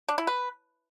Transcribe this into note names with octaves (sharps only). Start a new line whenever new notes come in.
D4
E4
B4